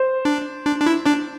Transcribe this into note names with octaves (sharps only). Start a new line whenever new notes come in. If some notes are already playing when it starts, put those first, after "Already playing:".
Already playing: C5
D4
D4
D4
E4
D4